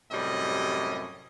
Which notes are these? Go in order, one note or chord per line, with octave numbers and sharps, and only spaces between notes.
F#2 A2 C3 G3 D#5